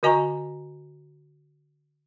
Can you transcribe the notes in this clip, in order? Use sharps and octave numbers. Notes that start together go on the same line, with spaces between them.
D3 F#4 D#5 G#5 A#5 C#6